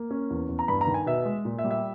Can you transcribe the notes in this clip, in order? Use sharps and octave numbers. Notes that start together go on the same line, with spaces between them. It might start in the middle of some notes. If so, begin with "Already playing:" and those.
Already playing: A#3
C#4
E2
E2
A#5
G2 B5
A#5
D#3
G#5
B2 E5
G#3
A#2
E5
G3
E5